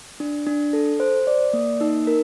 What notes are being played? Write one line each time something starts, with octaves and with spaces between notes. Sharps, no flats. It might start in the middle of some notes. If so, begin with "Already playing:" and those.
D4
D4
A4
C5
D5
A#3
D#4
A#4